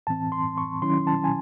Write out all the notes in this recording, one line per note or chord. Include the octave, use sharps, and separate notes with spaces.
A2 E3 C4 A5
C6
C#6
D#3 F#3 C#4 E4 C6
A5
G#5